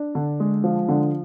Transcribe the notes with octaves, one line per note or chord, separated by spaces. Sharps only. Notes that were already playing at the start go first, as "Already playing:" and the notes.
Already playing: D4
D3
G#3
F3
D3